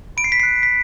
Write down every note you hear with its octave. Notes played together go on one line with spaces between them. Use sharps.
B5 D7
C7
B6
F#6 C7
B6